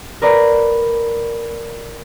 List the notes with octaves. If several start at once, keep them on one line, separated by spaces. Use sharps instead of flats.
A#4 B4 D5 A#5